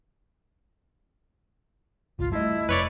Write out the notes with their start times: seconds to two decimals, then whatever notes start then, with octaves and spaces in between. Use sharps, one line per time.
2.19 G#1 C#2 F4
2.32 G3 A3 E4 D#5
2.69 F1 F2 B4 C#5 D5